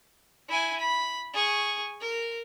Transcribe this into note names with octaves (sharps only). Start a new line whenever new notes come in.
E4 G#5
B5
G#4 C#6
A#4